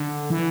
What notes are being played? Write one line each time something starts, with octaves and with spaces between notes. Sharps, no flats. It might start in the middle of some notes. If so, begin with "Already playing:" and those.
Already playing: D3
E3